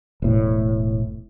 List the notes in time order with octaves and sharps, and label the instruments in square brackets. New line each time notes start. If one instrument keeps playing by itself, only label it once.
[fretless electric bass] E1 A2